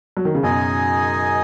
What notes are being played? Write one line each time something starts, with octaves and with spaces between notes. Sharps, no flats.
F#3
D#3
C#3
F#2 B2 D#4 G#4 D#5 G#5